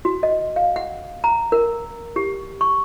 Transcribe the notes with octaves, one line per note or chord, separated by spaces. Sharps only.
F#4
D#5
F5
F#5
A#5
A#4
G4
C#6